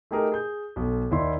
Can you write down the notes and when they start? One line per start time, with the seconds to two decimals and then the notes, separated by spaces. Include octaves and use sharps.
0.11 A3 D#4 G4 G#4 A#4
0.32 G#4 G6
0.76 B1 A4
1.11 D#2 D#4 E4 D5 C6